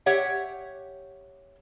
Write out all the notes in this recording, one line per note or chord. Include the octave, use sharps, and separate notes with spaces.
G4 C#5 E5 F#5